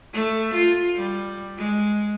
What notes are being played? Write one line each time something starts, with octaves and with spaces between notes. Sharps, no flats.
A3
F4
G3
G#3